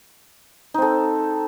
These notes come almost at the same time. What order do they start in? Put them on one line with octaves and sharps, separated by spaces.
D#4 C4 A4